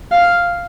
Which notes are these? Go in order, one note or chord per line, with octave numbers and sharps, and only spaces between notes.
F5